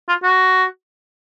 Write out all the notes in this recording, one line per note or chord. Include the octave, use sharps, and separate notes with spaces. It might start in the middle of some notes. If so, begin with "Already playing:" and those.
F4
F#4